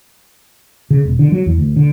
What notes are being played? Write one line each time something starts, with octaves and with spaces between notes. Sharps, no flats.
C#3
E1
D3
F#3
E2
D2
D3